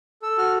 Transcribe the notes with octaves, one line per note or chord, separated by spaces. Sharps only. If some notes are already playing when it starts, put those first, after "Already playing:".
A4 E6
F#4 F6